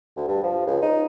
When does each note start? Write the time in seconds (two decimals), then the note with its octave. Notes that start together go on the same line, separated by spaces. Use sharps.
0.17 D2
0.28 G2
0.43 F3
0.67 C#2
0.82 D#4